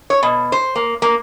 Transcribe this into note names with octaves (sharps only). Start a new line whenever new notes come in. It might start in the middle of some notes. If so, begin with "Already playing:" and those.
C#5
B2
C5
A#3
A#3